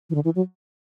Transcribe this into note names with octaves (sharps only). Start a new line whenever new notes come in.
E3
D3
E3
F#3